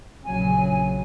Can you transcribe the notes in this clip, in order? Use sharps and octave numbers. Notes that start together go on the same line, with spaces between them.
A#1 C#3 F#3 G#5